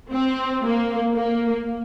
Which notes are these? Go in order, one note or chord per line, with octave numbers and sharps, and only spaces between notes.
C4
A#3
A#3